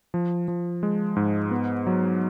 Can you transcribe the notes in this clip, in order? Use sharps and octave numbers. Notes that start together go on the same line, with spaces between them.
F3
F3
G#3
G#2
B3
F#3